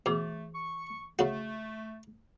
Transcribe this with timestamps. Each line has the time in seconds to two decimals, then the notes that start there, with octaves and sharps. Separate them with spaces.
0.06 B2 E3 A3 G#4 D6
0.55 C#6
1.19 C#3 A3 F#4